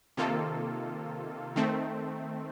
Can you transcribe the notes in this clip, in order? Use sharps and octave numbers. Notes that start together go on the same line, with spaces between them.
C3 D#3 A#3 F4 A4
D#3 A3 C4